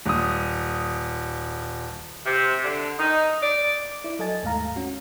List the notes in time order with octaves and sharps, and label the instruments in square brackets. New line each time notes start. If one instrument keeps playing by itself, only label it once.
[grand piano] D#1 D#6
[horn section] C3
D3
D#4
D5
[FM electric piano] E4 D5
F#3 A4 D#5 G#5 A6
D#2 G#2 A3 F5 A#5
C#4 F#4